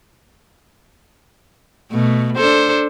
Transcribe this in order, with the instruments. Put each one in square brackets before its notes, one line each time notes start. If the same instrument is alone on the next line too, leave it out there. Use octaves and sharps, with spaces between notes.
[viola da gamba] B2 A3
D4 A4 C5